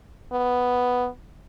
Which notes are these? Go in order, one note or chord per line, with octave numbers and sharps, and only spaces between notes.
B3